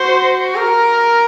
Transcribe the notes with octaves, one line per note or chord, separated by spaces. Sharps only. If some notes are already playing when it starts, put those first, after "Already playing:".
Already playing: F#4 C5
A#4